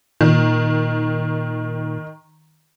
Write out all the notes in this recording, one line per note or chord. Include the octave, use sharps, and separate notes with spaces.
A#2 D#3